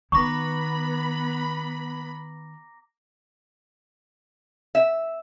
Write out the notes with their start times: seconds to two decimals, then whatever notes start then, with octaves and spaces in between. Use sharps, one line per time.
0.12 D#3 B3 A#5 B5 C#6 D6 A#6
4.75 E5